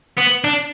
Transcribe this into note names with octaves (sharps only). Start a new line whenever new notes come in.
B3
D4